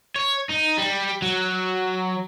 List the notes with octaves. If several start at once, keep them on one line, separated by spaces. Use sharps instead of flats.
C#5
D#4
G3
F#3